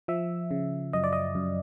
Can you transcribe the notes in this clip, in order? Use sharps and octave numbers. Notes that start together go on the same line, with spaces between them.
F3 E5
C#3
F#2 D#5
D5
D#5
F#2